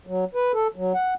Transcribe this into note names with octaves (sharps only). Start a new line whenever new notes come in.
F#3
B4
A4
F#3
F#5